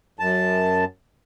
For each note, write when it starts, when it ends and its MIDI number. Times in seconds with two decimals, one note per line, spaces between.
0.19 0.84 42
0.19 0.84 81